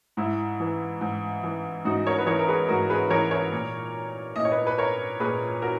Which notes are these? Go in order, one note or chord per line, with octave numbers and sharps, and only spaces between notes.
G#2 E4
E3
G#2
E3
G#2 D#4 F#4
A#4 C#5
B4
E3 A#4 C#5
A#4
G#4 B4
G#2 F#4 A#4
G#4 B4
E3 A#4 C#5
A#4 C#5
A#2
A#2 D#5
C#5
B4 D#5
B4
A#4 C#5
A#2 G#4 B4
F#4 A#4